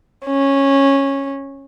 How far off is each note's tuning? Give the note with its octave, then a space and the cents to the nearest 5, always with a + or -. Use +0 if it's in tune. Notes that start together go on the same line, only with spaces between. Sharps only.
C#4 -10